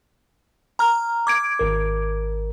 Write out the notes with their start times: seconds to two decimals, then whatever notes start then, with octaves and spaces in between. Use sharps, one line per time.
0.79 A#5 F6
1.27 D6 G#6 D7
1.59 G#1 A#4